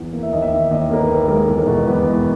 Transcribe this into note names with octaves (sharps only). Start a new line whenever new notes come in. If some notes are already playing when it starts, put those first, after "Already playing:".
Already playing: E2
A#3
E5
D#2 D#5
E5
D#3
D#2 D#5
A#3 A#4
B4
D#2
G#3 A#4
E2
A#4
B2
E2 B4
G#3